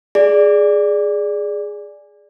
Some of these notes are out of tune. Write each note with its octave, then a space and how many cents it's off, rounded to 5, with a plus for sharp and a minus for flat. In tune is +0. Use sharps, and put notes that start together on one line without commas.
G#4 +0 D5 +0